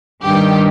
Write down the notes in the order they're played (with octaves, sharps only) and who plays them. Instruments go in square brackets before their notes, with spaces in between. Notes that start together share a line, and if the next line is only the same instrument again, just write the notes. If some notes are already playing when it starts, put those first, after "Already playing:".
[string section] G2 D#3 G4